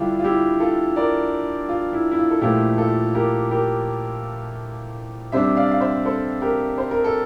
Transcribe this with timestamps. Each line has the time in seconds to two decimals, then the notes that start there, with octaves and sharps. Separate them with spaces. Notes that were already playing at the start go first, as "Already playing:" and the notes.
Already playing: D3 G3 D4 E4 F4 G4
0.19 F4
0.24 E4 G4
0.60 F4 A4
0.96 A#4 D5
1.69 F4
1.93 E4
2.11 E4
2.18 F4
2.31 A4
2.41 A#2 F3 A3 E4 G4
2.78 F4 A4
3.15 G4 A#4
3.51 G4 A#4
5.32 C3 G3 D4 C5 E5
5.57 D5 F5
5.71 F5
5.81 C5 E5
6.05 A4 C5
6.42 G4 A#4
6.78 C5
6.91 A#4
7.04 A4